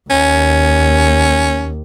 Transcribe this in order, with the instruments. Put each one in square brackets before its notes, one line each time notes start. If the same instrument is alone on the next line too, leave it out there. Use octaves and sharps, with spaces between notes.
[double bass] D#2 [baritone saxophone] C#4